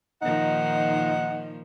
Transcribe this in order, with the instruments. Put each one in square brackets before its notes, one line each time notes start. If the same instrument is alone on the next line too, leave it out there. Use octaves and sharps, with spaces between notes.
[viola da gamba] A#2 D#3 F3 [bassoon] D#4 [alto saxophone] F#5